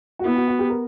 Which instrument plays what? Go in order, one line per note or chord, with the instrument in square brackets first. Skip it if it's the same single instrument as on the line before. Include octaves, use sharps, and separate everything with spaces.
[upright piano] F#4
[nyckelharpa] B3 [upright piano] E4
[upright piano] F#4
F#4
G4
A#4